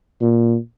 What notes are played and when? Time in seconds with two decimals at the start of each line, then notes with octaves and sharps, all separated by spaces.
0.21 A#2